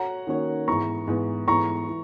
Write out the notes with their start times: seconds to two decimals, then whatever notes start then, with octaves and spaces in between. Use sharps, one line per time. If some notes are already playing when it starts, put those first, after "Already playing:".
Already playing: F#4 C#5 F#5 A#5
0.27 D#3 A#3 C#4 F#4 C#5
0.67 G#2 E3 B3 A#5 C#6
1.07 G#2 E3 B3
1.48 G#2 E3 B3 A#5 C#6
1.89 E3